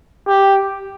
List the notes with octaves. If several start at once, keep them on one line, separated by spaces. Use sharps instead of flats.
G4